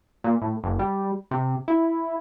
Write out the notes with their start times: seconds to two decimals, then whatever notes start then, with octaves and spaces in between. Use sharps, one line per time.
0.24 A#2
0.42 A2
0.64 F#1
0.79 G3
1.31 C3
1.68 E4